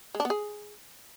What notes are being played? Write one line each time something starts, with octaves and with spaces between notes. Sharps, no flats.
G#3
D4
B3
G#4